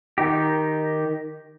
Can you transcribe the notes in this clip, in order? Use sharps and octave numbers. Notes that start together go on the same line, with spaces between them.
D#3 D#4 G4